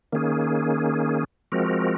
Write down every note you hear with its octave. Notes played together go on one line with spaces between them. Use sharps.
D#3 A#3 C#4 G#4
F3 G#3 C4 F#4 A#4